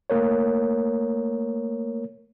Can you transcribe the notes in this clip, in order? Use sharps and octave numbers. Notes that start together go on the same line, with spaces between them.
A3 A#3 A#4 C#5